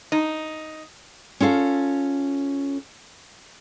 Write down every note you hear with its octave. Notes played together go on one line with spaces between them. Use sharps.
D#4
C#4 F4 A4 F5